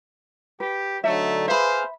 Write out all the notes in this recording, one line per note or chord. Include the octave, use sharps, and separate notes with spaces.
G4 B4
D3 F#3 A3 D#4 E5
G#4 B4 C5 E5 F5 B5